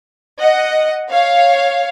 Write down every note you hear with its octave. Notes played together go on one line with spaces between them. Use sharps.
D#5 F#5
C#5 F5